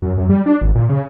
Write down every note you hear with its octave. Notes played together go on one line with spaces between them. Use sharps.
F#2
F#2
G3
D4
G#1
A#2
C#3